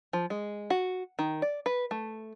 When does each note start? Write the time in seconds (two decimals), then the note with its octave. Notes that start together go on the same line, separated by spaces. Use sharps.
0.13 F3
0.30 G#3
0.70 F#4
1.19 D#3
1.42 D5
1.66 B4
1.91 A3